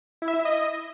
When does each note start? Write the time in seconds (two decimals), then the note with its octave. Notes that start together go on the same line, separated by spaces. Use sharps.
0.22 E4
0.28 E5
0.34 E4
0.39 E5
0.45 D#5